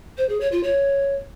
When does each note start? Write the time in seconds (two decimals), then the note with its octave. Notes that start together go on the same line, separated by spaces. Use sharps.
0.18 C5
0.29 G#4
0.41 C#5
0.52 F4
0.63 C#5